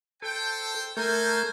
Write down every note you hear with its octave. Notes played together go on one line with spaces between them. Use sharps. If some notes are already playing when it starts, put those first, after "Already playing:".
A4 C5 G5
A3 A4 A#4 C5 G#5 G6